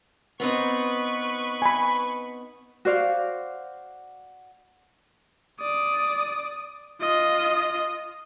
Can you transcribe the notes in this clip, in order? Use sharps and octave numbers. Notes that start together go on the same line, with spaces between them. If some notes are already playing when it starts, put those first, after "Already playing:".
B3 C4 D#4 B4 C#6
G#5 B5
F#4 C5 D5 F5
D5 D#6
F4 D#5